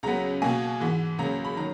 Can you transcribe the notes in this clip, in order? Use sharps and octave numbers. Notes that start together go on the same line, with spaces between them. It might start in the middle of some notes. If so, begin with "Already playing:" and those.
C#2 C#3 F#3 B3 A#5
B2 A#3 G#5
G#2 E3 B3
C#2 C#3 F#3 A#3 A#5
B5
D#3 F#3 A#5